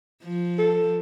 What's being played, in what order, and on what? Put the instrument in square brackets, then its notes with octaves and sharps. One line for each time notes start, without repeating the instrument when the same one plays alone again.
[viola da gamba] F3
[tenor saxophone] A4